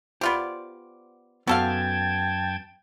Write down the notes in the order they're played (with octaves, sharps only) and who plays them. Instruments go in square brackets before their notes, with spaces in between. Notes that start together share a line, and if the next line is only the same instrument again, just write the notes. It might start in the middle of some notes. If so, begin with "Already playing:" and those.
[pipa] B3 F4 G4 [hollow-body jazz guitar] C5 D5
[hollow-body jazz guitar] F#2 B3 [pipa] F#4 A4 F5 [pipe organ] G5 A5 G#6